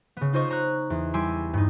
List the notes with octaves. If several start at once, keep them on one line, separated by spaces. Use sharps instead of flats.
C#3 B3
D#4 F4 C5 D#5 C#6
A#5 C#6 F#6
E2
G3 E4 G4 G#5 C6 E6
G2 D#4